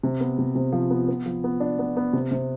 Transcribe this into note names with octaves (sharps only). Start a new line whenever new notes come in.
C3
B3
C3
C3
F3
B3
B3
F3
B3
D4
B3
B3
C3
C3